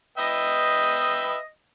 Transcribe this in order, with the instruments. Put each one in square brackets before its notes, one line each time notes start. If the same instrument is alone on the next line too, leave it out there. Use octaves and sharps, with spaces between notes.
[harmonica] B4 E5 G5 [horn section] D#5